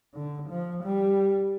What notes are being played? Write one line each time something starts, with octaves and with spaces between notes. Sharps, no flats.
D3
F3
G3